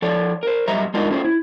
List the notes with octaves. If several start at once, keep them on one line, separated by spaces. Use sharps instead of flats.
F3 A4 C#5 D5
A#4 C5
F#2 G3 D#5 E5 A#5
G#3 D4 D#4 F4 A#4 D#5
A3 C#4 F4 C5
E4